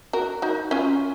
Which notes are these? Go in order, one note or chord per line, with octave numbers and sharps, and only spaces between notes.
F#4 A#4
D#4 F#4
C#4 F4